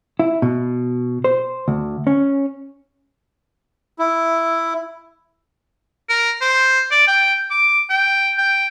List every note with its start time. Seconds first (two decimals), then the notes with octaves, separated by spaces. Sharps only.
0.19 E4
0.42 B2
1.24 C5
1.68 D2
2.07 C#4
3.99 E4
6.09 A#4
6.41 C5
6.91 D5
7.08 G5
7.51 D6
7.90 G5
8.38 G5